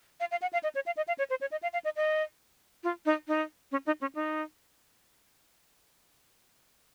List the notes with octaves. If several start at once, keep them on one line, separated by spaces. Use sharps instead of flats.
F5
F5
F#5
F5
D#5
C#5
F5
D#5
F5
C#5
C5
C#5
D#5
F5
F5
D#5
D#5
F4
D#4
D#4
C#4
D#4
C#4
D#4